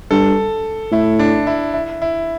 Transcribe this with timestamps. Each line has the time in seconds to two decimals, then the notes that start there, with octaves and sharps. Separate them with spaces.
0.11 G2 A4
0.92 A2 E4
1.19 D4
1.47 E4
1.73 E4
2.02 E4